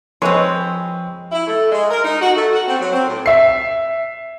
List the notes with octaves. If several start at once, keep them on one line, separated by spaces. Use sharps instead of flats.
F3 G#3 C4 B4 C#5
E4
A3
G#3
A#4
D#4
F#4
A3
F#4
C4
F#3
C4
A2
E5 C7